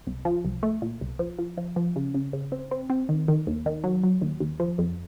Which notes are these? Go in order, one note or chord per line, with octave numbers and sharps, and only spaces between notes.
C2
F3
C2
A3
A#2
C2
F3
F3
F3
F3
C#3
C#3
C#3
C4
C4
C4
D#3
D#3
D#2
D#3
F#3
F#3
D#2
D#2
F3
F2